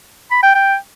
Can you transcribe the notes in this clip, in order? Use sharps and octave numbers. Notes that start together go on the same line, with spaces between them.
B5
G5
G5